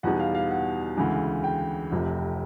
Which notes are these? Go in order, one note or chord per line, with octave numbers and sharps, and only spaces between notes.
E2 B2 G3 B3 D#4 F#5
F5
F5
F#5
D2 C#3 E3 G#3
G5
F1 F2 C3